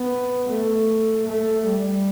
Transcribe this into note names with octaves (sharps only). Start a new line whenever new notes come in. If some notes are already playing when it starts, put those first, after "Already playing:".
Already playing: B3
A3
A3
G3